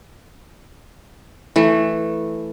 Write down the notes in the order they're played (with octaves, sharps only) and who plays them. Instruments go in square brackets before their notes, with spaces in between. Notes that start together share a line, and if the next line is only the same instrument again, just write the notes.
[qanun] E3 A3